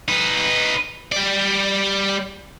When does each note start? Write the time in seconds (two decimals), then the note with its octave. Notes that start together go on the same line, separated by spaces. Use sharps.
0.08 D#4 B4
1.12 G3 D5